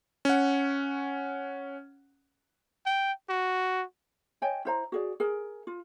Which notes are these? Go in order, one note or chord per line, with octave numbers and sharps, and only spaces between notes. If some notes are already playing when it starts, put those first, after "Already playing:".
C#4 F#5
G5
F#4
C#5 D#5 G5 G#5
E4 C5 A#5
F#4 G#4 D5
G#4 A#4
F4